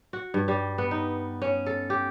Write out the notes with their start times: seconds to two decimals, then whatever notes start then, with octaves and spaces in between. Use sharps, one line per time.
0.13 F#4
0.34 G2
0.48 G3
0.78 B3
0.91 D#4
1.42 C#4
1.66 A4
1.90 G4